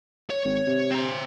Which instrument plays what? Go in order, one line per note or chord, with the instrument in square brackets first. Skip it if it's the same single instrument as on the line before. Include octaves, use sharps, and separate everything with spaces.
[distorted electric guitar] C#5
[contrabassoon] G#1
C3
[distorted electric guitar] C4 A#5